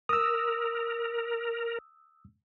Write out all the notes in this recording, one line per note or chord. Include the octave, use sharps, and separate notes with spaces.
A#4 D#6 E6